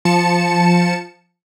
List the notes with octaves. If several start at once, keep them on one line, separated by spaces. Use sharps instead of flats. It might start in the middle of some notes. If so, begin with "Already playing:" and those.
F3 A5 C#7 E7